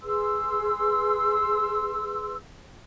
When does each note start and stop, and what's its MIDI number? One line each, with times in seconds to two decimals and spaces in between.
0.02 2.34 68
0.02 2.34 71
0.02 2.34 84
0.02 2.34 88